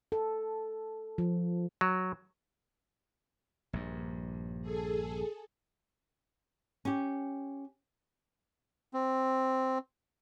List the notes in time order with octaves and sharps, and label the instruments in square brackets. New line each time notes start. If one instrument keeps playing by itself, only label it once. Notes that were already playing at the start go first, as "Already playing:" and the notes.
[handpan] A4
F3
[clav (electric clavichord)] F#3
[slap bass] A#1 G2
[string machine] G#4 A4
[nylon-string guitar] C#4 G4
[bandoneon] C4